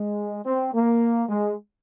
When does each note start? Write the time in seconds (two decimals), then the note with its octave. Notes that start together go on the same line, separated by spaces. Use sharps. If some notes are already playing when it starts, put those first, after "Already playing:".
Already playing: G#3
0.45 C4
0.73 A#3
1.29 G#3